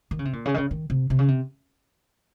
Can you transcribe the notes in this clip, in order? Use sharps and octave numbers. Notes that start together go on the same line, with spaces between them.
D#3
C#3
C3
A#2
C#3
D#3
C#3
D#3
C3
C3
C#3
C3